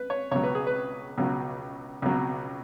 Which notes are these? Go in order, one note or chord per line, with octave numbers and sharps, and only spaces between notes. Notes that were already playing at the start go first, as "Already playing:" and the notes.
Already playing: B4
C#5
C#2 B2 F#3 C#5
B4
G#4
B4
C#2 B2 F#3
C#2 B2 F#3